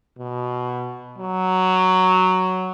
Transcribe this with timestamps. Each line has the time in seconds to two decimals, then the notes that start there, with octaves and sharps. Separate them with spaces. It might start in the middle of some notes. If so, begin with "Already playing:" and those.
0.19 B2
1.18 F#3